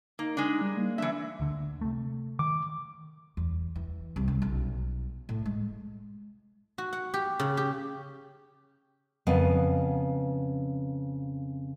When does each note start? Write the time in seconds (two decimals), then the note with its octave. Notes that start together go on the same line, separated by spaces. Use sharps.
0.19 A#3 D#4
0.37 G#3 D4
0.61 G3
0.77 A#3
0.98 E3 D4 E5
1.40 D2 D3
1.81 C3 A3
2.39 D#3 D6
3.37 E2
3.76 E3
4.16 C2
4.28 C#3
4.42 B1
5.29 A2
5.46 G#3
6.78 F#4
6.93 F#5
7.14 G4
7.40 C#3
7.57 G4
9.27 F2 C#3 B3